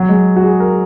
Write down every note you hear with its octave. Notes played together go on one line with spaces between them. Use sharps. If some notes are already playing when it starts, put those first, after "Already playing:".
Already playing: F#3
G#3
F#4
G#4
A#4